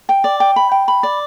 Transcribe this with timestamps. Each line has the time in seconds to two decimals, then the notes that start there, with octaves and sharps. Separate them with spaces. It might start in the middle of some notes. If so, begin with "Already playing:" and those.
0.09 G5
0.24 D5
0.40 G5
0.56 B5
0.72 G5
0.88 B5
1.03 D5